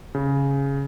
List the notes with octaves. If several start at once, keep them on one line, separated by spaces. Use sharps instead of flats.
C#3